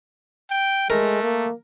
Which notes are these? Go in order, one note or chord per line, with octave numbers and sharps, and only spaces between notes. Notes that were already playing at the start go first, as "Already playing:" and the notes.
G5
G#3 A3 A#4
A#3